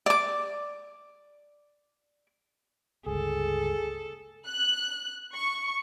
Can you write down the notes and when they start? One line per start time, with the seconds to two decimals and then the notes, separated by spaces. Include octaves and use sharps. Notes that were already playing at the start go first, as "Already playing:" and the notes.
0.06 D5 D6
3.06 G1 C#2 G#4 A4
4.47 F#6
5.33 C#6